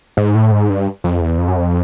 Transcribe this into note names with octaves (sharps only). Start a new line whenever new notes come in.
G#2
A2
G#2
G2
F2
E2
F2
F#2
F2